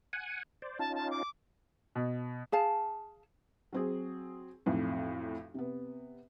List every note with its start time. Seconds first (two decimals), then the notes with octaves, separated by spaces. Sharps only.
0.13 F#5 G#5
0.62 C5 D5
0.79 C#4 D#4 F4 A5
0.95 A5
1.10 D6
1.95 B2
2.52 G#4 F5 A5
3.73 F#3 C4 G#4
4.66 B1 F2 A2
5.54 C3 B3